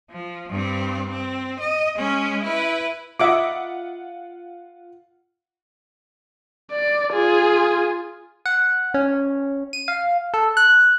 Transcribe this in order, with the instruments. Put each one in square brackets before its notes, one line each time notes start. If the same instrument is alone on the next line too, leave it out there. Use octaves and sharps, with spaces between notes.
[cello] F3
G2 C4
C4
D#5
G#3 C#4
E4 B4
[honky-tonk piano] F4 F#5 [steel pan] D#5 E5 D6
[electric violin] D5
F4 G#4
[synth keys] F#5
C#4
D#7
F5
A4
F#6